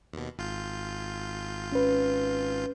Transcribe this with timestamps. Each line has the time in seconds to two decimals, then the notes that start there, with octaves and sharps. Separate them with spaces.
0.14 D#2 B2
0.38 G#1 F4 G6
1.72 C#4 B4